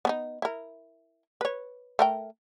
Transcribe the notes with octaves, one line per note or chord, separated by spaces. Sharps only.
B3 C#4 D#4
E4 A#4
B4 C#5
A3 A#4 G5